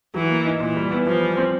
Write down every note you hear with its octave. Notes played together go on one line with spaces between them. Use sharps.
E3 F#3
A#3
D#4
A#2 E3
G3
B3
E3 F3
G3
C4